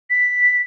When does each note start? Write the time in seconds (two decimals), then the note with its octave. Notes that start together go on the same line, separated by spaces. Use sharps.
0.10 B6